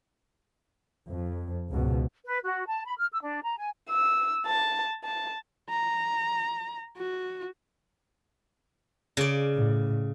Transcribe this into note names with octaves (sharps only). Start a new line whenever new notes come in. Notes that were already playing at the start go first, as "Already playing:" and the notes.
F2
C#2 G#2 B2
B4
F#4
A5
B5
F6
E6
D4
A#5
G#5
E6
A5
A5
A#5
F#4
C#3 D5
A2